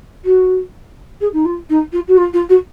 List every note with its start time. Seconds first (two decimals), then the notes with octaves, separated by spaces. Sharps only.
0.25 F#4
1.21 G#4
1.33 D#4
1.45 F4
1.70 D#4
1.93 F4
2.08 F#4
2.17 F4
2.33 F4
2.49 F#4